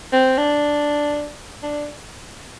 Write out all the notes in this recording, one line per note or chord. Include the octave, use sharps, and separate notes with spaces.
C4
D4
D4